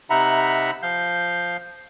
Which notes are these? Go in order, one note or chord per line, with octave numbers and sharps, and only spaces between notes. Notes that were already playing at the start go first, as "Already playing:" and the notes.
C3 D#4 E5 F#5 A#5 B5
F3 F5 G6